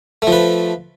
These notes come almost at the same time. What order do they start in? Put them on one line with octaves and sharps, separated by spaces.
A3 F3 B4